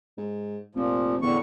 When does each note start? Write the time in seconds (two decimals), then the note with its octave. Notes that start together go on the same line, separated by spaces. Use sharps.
0.18 G#2
0.75 F1 A#2 F3
1.22 E2 A2 D3 C#6